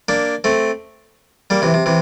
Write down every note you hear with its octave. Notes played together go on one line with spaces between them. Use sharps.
A#3 D4
A3 C4
G3 A#3
C3 E3
C3
C3 E3